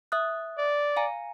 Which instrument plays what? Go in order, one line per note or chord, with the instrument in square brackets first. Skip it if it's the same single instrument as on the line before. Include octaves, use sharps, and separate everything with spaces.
[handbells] E5 D#6 F#6
[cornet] D5
[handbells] F5 G#5 A#5